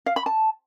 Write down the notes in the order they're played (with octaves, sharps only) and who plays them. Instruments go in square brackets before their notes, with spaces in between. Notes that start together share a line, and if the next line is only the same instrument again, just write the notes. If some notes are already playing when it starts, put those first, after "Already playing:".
[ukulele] F5
B5
A5